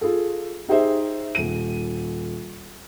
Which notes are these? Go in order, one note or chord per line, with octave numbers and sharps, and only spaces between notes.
F4 G#4 A4
D#4 G4 G#4 C5 E5
D#1 D#7